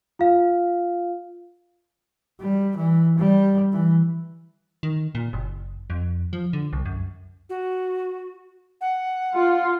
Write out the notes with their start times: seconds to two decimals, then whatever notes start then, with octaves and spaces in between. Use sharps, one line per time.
0.19 F4 F5
2.40 G3
2.76 E3
3.18 G3
3.72 E3
4.83 D#3
5.15 A#2
5.33 F#1
5.90 F2
6.33 F3
6.53 D3
6.73 C2
6.86 F#2
7.49 F#4
8.81 F#5
9.34 F4